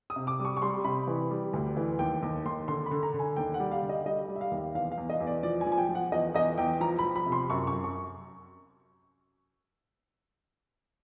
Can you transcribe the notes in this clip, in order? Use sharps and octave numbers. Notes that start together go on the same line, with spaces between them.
D#6
C3
D6
G3
C#6
C#6
G3 C6
C3 B5
E3
G3
D2
E3
D#2 G5
D#2
D#2 C6
D3 C6
B5
D3
A#5
D3
G#5
D#2 G5
F#5
G3
F5
D3
D#5
G3 D#5
G3
E5
F5
D#2
E2 F5
F5
E2
D#5
E2
D5
F3 D5
G#5
F3
G#5
G5
F3
F#5
E2 D#5
E2 D#5
E2 G5
F3 A#5
B5
F3
B5
C3
C6
F#2 C#6
C#6
F#2
C#6